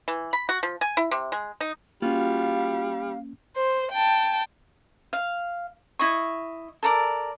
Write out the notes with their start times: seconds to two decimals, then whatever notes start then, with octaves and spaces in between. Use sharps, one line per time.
0.08 E3
0.33 B5
0.49 F#4
0.63 F3
0.81 G#5
0.97 E4
1.11 C3
1.32 G#3
1.61 D#4
2.02 G3 A#3 C#4 F4 F#4 F5
3.56 C5
3.92 G5 A5
5.13 F5
5.99 E4 D#5 C#6
6.83 A4 A#4 D5